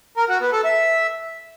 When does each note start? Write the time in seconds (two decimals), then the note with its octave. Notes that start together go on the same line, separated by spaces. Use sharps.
0.17 A#4
0.29 F#4
0.41 B3
0.53 A4
0.64 E5